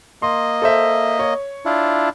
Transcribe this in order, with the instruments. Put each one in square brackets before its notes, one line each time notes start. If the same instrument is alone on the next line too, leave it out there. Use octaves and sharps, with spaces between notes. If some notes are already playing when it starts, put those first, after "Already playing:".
[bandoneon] A#3 D#5 [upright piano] C6
[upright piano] A4 C5 E5
C#5
[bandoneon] D4 E4 F4